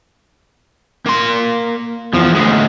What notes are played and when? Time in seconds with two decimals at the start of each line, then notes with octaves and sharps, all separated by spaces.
1.06 A#3 C6
2.13 E2 F3
2.35 D2 G#3